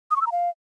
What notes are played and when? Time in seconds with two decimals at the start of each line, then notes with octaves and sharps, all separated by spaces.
0.11 D#6
0.16 C#6
0.21 E6
0.27 A#5
0.32 F5